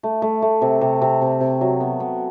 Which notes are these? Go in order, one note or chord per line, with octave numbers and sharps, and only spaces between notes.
A3
A3
A3
C3
C3
C3
C3
C3
F#3
B3
B3